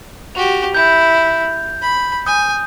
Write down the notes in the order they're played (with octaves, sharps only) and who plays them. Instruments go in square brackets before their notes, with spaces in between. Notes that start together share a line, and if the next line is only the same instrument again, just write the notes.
[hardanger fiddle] F#4 G4 [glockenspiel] F7
[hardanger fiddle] E4 [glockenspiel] G6
[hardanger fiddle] B5
[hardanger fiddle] G#5 [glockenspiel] D#6 G6